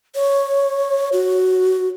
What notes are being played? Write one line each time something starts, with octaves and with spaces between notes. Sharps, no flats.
C#5
F#4